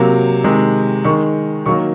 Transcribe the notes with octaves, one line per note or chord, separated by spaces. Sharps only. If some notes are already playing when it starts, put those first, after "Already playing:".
Already playing: C3 F#3 A#3 A#5
C3 D#3 G#3
D#3 G#3 C#6
D#3 F#3 A#3 C#6